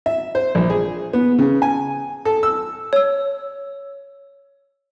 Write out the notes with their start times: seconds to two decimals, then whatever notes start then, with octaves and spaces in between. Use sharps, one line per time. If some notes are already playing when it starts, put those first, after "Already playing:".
0.06 E5
0.35 C5
0.55 A#1
0.70 G#4
1.13 B3
1.39 C#3
1.62 G#5
2.25 A4
2.43 E6
2.93 C#5 E6